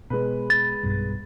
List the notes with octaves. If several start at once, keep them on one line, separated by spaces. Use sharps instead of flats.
B2 G#3 B4
A6
B1 G2